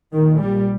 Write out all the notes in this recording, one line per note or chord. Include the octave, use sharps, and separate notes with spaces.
A#1 A#2 D#3
G3